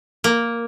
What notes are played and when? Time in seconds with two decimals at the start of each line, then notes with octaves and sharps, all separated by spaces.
0.24 A#3